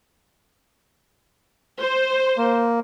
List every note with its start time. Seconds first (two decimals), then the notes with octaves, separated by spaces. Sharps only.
1.80 C5
2.38 A#3